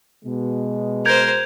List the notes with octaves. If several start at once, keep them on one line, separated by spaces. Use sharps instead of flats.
B2 G#3
A#4 C5 G6 G#6 F7